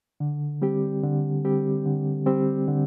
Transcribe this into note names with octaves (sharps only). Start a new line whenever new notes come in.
D3
G3 C4 G4
D3
G3 C4 G4
D3
G3 C4 G4
D3